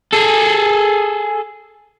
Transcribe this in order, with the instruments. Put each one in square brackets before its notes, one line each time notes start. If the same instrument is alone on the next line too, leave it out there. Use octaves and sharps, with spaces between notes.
[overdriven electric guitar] G#4 A4